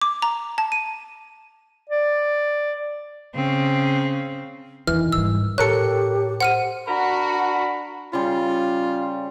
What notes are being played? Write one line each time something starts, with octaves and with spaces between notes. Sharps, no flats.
D6
A#5
A5
D#7
D5
C#3 C4
F2 D#3 E3 F6
G#2 G3 E6
A2 G4 A4 A#4 C#5 F#6 C#7
C5 F#5 F6 D#7
D4 F#4 A#4 B5
C#3 G3 F4